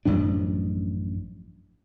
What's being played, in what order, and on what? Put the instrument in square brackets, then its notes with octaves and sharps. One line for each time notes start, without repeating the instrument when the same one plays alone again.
[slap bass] A1 F#2 F3 D4